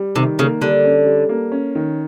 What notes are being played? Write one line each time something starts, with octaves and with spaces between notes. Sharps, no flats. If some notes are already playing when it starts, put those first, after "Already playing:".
Already playing: G3
C3 D#3
C#3 A#3
D3 G3
C#4
G3
A#3
C#4
D#3